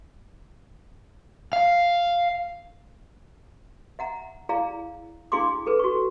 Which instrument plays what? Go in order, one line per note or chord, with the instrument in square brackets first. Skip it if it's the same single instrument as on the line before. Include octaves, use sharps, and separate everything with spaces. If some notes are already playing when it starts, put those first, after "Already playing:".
[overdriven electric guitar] F5
[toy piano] E5 F#5 A#5
E4 G#4 D5 F5 A#5
D4 E4 G#4 F5 C6 D6
G#4 A4 B4
F#4 C#6